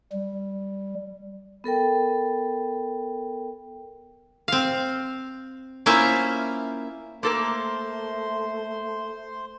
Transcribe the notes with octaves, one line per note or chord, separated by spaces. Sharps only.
G3
B3 A4 A#4 G5
C4 F5
A#3 C#4 E4 F4 C5 E5
A3 A#3 A4 A#4 C5 C6